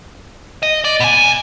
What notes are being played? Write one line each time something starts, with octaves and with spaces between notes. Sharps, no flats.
D#5
D5
B2 G#5